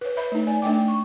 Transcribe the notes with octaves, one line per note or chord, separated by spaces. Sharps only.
B4 C#5
B4 C#5 E5 B5
A3 D#4
D5 G#5
A3 D4 D5 G5 D6
C#6